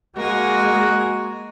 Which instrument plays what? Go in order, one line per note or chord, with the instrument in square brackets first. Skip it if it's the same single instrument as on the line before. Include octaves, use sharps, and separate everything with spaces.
[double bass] G#3 [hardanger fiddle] A#3 G#5 [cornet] F#4